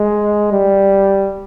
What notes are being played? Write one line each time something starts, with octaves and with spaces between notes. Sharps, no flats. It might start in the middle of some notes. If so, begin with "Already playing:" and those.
Already playing: G#3
G3